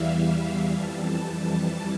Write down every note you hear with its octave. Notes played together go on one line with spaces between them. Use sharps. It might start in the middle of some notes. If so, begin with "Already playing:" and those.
Already playing: E2 E3 G3 E5 F5
F5
F2 E3 G3 A5